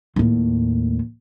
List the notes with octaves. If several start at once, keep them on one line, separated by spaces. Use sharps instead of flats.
D#2 A2